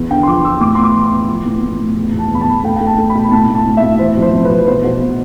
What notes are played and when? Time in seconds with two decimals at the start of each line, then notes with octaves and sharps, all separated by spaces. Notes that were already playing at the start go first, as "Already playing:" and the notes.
Already playing: E2
0.10 D3 G5
0.23 C6
0.27 F3 D6
0.44 F3 E6
0.61 A2 D6
0.75 C6
0.79 B3
0.84 D6
0.95 E3
1.06 C6
1.13 B3
1.29 F3
1.46 A2
1.63 A2
1.79 A2
1.97 E2
2.14 E2 A5
2.30 E2 B5
2.41 A5
2.48 E2
2.64 A3 G5
2.76 A3 G5
2.87 A5
2.98 A3
3.10 B5
3.15 B2
3.31 A2 A5
3.49 A2
3.55 A5
3.66 A2
3.77 E5
3.83 A2
3.99 E3 C5
4.17 F2 C5
4.33 F2
4.45 B4
4.50 F2
4.67 B2 C5
4.84 B2
5.01 B3